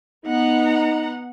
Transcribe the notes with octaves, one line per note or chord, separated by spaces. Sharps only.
B3 D#4 F#5 A#5